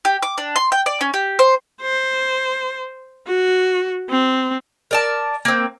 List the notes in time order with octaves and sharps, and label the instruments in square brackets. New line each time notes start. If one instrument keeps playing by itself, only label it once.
[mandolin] G4
D6
D4
C6
G5
D5
C#4
G4
C5
[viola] C5
F#4
C4
[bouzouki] A#4 D5 A5
A#3 C4